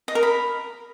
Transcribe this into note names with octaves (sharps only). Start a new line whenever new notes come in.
D#5
A#4
B5